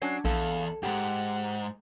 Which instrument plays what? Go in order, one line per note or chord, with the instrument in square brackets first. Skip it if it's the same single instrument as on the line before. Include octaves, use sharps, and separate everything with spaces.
[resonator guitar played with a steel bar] F#3 C#4 D4 [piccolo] C7
[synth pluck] A#1 [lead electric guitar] E2 [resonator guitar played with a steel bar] A4 [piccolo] F5
[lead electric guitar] E2 G#2 [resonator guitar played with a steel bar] G4 [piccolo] F#5